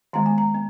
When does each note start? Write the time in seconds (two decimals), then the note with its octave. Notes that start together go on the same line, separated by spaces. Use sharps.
0.13 D#3 G#3 B3 A#5
0.26 G#5
0.38 A#5
0.55 B3